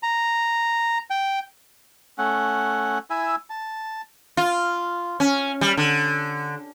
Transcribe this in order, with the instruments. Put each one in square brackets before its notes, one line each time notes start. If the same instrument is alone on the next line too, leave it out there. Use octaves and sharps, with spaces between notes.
[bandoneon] A#5
G5
[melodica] A3 C#4 F#5
E4 E5 G#5 E6
A5
[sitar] F4
C#4
G3
D3